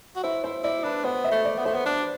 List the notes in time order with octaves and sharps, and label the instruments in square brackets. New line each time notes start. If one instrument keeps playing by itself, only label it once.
[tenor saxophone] F#4
[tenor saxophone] E4 [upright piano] C5
[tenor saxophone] E4 [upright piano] C5
[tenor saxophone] E4 [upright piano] D5
[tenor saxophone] D4 [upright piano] B4
[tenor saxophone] B3 [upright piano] C5
[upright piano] E5
[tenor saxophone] A3
[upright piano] D5
[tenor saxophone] B3
[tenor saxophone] A3 [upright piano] C5
[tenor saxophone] B3
D4